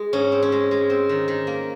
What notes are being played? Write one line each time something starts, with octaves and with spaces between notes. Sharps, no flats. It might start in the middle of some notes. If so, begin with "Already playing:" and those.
Already playing: G#3
G#2 C#4
C4
C#4
G#3
G#3
C4
D#3
D#3
A#3